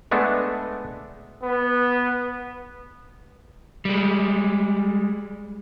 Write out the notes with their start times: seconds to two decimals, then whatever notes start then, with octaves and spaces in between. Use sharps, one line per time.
0.11 G#3 A3 B3 D4 A4
1.43 B3
3.85 G3 G#3